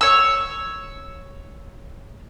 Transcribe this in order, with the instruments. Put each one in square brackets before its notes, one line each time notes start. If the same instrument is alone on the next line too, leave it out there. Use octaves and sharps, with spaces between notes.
[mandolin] C#5 E6